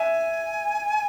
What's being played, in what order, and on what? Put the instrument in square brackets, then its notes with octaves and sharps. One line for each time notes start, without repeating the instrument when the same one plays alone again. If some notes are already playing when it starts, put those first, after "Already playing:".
Already playing: [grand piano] E5 [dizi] G#5